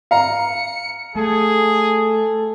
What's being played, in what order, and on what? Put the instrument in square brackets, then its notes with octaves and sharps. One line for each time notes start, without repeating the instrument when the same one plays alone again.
[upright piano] F5 A#5 [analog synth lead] C#7
[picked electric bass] A3 [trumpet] G#4 [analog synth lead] A4